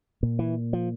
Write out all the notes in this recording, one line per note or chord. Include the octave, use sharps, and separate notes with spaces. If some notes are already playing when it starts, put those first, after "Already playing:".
A#2
E3
F3